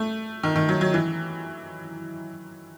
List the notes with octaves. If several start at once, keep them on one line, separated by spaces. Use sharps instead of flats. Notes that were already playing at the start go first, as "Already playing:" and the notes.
Already playing: A3
D#3
D#3
F#3
F#3
E3